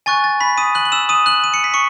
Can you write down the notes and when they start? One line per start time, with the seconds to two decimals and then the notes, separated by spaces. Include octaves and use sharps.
0.06 G#5 C#6 F#6 A6
0.24 A6
0.40 B5 B6
0.58 D#6 D#7
0.75 F#6 F#7
0.85 F#7
0.92 E6 E7
1.09 D#6 D#7
1.26 F#6 F#7
1.44 D#7
1.54 C#7
1.64 B6
1.74 C#6 C#7